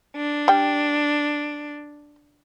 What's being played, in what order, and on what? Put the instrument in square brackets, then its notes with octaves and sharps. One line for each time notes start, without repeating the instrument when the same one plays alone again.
[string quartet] D4
[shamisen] G3 G5